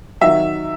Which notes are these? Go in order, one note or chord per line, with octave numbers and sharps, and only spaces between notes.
D#3 F#3 E5